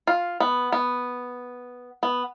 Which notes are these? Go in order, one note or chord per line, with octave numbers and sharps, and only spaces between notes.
F4
B3
B3
B3